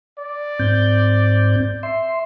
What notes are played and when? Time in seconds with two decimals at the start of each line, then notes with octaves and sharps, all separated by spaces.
0.19 D5
0.60 G#2 C4 G6
1.83 E5 C6